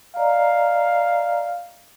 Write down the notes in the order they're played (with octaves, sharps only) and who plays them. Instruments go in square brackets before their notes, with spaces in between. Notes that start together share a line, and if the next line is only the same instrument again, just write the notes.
[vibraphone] D5 D#5 A#5 [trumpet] F5